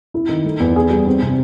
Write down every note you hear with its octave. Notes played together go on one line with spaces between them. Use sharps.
E4
D#3
A3
E2
G#4
G3
C4
C3